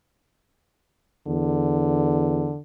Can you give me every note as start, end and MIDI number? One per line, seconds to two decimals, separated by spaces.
1.27 2.51 40
1.27 2.60 50